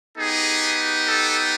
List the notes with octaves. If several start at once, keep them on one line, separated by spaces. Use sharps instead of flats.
B3 D#4 G4 G#4
A4